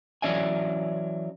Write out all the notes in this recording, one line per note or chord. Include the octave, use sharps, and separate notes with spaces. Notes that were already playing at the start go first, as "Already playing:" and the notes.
E3 F#3 C#4 D5 E5 G#5